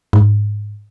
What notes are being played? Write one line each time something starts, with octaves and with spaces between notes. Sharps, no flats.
G#2